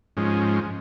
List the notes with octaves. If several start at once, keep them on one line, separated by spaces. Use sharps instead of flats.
G#2 F3 G#3 C#4